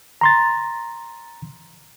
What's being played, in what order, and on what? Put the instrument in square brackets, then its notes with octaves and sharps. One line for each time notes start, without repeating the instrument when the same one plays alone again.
[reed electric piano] A#5 C6 A6